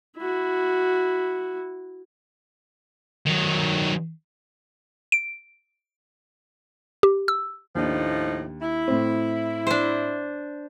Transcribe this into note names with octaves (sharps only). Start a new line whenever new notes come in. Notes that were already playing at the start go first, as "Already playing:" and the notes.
E4 F#4
D#3 F#3
D7
G4
E6
D#2 A2 F3 D4 D#4
E4
A2 C4
D4 C5